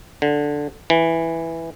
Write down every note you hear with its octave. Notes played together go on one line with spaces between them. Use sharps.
D3
E3